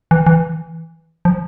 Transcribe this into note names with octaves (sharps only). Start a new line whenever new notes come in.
E3
E3
F3